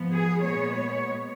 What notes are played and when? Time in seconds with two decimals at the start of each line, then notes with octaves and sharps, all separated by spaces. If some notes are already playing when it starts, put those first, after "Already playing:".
Already playing: G#2 F3 B3
0.12 G#4
0.42 A#2 G#3 B3 C#5
0.74 C#5